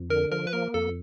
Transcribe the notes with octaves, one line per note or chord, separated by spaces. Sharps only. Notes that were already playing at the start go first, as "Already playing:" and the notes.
Already playing: F2
D3 A#4
F3 A#4
B4
A#3 A#4
F2 A4